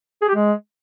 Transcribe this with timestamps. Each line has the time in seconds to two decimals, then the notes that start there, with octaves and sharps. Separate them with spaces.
0.22 G#4
0.28 G4
0.35 G#3